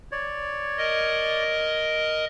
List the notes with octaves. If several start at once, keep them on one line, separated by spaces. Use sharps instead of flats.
C#5 D5
A#4 D#5